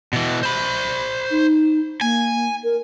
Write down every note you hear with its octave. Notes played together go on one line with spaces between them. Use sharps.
B2 E3
C5 B5
D#4
A#3 G#5
A#4